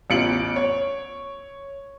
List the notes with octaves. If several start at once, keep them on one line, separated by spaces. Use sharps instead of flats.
A1 E2 F4 C#7 D7 F#7
C#5